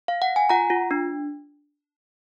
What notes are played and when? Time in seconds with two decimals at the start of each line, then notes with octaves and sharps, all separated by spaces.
0.08 F5
0.22 F#5
0.36 G#5
0.49 F4 F#5 A#5
0.70 F4
0.91 D4